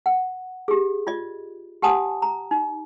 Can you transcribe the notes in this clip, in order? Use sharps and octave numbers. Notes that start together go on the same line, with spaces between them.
F#5
G4 G#4
F4 D5 D#5
G4 F#5 G#5 A5 D#6
A#5
D#4